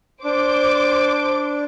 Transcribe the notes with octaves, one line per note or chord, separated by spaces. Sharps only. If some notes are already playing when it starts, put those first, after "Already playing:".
D4 C5 D6